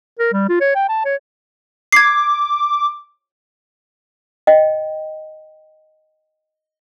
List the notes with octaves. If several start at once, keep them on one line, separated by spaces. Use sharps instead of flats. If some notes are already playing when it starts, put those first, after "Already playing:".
A#4
G3
F4
C#5
G5
A5
C#5
D6 G#6 C7
D#5 G5